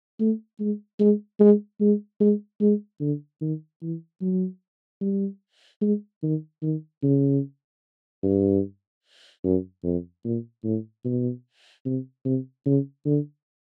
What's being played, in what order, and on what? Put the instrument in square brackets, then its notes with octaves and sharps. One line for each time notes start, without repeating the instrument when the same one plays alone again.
[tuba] A3
G#3
G#3
G#3
G#3
G#3
G#3
D3
D#3
E3
F#3
G3
G#3
D#3
D#3
C#3
G2
F#2
F2
A#2
A2
B2
C3
C3
C#3
D3